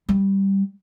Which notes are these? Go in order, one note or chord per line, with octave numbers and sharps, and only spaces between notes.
G3